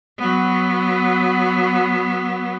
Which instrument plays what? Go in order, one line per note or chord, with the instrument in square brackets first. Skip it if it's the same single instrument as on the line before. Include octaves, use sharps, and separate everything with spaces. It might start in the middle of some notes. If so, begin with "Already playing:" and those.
[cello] F#3 B3